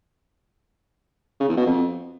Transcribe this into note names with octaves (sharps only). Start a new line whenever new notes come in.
C#3
E2
B2
F2